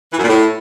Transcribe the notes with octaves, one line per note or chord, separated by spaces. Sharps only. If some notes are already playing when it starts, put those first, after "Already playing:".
E3
F#2
A#2
A2